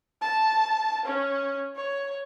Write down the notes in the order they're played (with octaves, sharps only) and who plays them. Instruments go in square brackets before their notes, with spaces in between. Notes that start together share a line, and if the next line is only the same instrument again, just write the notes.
[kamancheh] A5
C#4
C#5